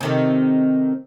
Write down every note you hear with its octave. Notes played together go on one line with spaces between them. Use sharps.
C3 D#3 A3